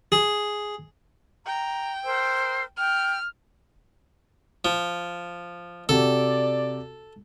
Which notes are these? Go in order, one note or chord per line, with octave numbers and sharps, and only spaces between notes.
G#4
G5 A#5
A#4 C5 E6
G5 F6
F3
C3 F#4 G4 A4 D5